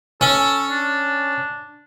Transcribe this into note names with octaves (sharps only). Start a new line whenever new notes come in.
C#4 A4
D4